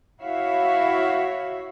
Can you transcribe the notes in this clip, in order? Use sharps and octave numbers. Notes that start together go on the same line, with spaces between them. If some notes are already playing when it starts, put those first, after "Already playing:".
E4 F#4 C#5 E5 F5